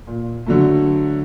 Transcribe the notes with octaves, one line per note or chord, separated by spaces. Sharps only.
A#2
D3 F#3 A3